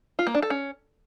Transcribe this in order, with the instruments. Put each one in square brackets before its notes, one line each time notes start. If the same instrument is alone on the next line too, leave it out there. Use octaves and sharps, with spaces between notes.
[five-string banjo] F4
A#3
D4
A4
C#4